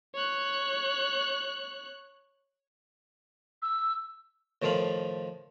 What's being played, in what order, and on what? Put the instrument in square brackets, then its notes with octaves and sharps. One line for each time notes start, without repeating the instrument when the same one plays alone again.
[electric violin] C#5 F#6
[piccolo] E6
[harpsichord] A2 D#3 F3 A4 F5 B5